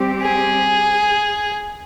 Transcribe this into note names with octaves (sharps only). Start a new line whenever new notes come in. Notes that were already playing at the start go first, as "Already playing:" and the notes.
Already playing: G3 C4 G4
G#4